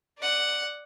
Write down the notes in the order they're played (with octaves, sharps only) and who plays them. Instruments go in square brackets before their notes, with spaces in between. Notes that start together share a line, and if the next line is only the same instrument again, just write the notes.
[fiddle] D5 F#5